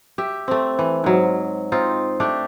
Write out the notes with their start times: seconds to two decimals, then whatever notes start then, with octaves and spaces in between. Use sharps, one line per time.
0.18 G4 E5
0.48 A3 C4
0.79 E3
1.04 G#2 F#3
1.72 C4 D#4 F4
2.20 A3 D4 G4